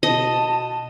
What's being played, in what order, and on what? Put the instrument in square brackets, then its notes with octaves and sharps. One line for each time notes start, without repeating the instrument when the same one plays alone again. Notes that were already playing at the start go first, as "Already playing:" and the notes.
[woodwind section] B2 [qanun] D#5 [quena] A5